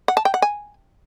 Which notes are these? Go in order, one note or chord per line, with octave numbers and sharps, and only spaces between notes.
F#5
A5
G5
F#5
G#5